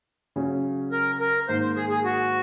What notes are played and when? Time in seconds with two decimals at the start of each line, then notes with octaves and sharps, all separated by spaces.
0.36 C#3 F#3 C#4
0.92 A#4
1.20 A#4
1.48 G#2 D#3 A#3 C5
1.62 C5
1.76 G#4
1.90 G#4
2.04 F#4